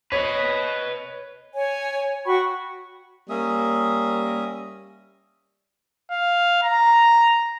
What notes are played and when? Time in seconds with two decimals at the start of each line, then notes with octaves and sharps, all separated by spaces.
0.12 B4 C#5 D#5
1.54 C#5 G#5
2.25 F#4 G5 B5 C#6
3.30 G3 A#3 C#4 E5 D#6
6.11 F5
6.63 A#5